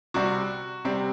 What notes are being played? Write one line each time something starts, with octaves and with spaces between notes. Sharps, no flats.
C3 G3 C4 F#4
C3 G3 C4